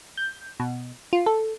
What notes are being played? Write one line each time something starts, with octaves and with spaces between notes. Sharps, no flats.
G6
B2
F4
A4